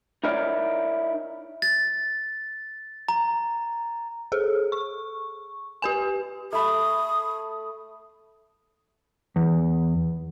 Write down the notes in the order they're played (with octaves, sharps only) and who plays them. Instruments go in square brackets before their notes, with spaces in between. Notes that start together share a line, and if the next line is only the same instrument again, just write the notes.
[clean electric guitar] D#4 E4 A#4 C#5 D5
[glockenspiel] A6
A#5
[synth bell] G#4 A4
C#6
G4 B4 G#5
[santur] A3 B5 [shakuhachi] D#6
[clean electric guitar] E2